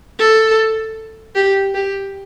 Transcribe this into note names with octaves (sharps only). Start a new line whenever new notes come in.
A4
G4
G4